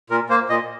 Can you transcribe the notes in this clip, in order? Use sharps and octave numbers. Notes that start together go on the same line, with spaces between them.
A#2 A#4
A#3 C5
A#2 D#5